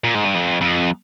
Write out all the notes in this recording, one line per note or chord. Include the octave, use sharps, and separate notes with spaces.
A#2
G#2
G2
F2
F2